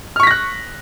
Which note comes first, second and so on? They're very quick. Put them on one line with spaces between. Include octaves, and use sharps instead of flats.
F6 C#6 B6 A#6 F#6